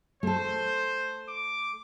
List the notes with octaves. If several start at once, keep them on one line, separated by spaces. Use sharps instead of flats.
A3 A4 C5
D6